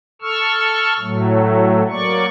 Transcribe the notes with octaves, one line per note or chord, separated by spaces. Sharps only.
A4 C#6 E6 F6
A2 F#3 A3
F#3 A#3 D5 C#6